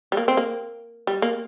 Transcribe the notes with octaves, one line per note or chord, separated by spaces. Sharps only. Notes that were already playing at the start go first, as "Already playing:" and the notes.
G3
A#3
C4
A#3
G3
A#3